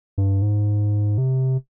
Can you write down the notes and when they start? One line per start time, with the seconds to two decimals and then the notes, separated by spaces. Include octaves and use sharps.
0.18 G2
0.42 G#2
1.18 C3